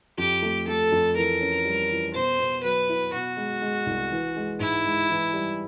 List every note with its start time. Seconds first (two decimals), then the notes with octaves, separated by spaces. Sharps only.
0.18 F2 G4
0.42 A3
0.68 A3 A4
0.92 F2
1.16 E3 A#4
1.40 C#4
1.65 G3
1.91 E3
2.14 B2 C5
2.39 B2
2.63 F#3 B4
2.89 E4
3.13 B2 F#4
3.37 G#3
3.62 G#3
3.86 C2
4.11 E3
4.36 G#3
4.60 G#2 E4
4.84 G#3
5.10 E3
5.33 G3